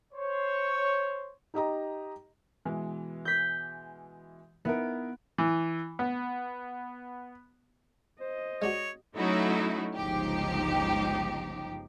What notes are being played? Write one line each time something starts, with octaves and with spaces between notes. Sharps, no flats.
C5 C#5
D#4 G4 D#5 A#5
B2 E3 G#3
G6 B6
B3 D#4 E4 A#4
E3
B3
C5 D#5
G#3 D4 F#4 C#5
F#3 A3 C#4 D#4 E4 F#4
G1 C#2 F3 D#4 G4